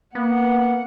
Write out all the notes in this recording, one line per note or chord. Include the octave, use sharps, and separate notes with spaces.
A#3 B3 F#5